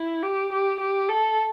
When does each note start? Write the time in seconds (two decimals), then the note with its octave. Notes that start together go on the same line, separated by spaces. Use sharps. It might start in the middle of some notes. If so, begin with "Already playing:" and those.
Already playing: E4
0.23 G4
0.52 G4
0.80 G4
1.09 A4